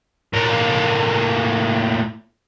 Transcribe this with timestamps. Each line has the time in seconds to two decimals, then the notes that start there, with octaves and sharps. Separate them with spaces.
0.33 A2 A#3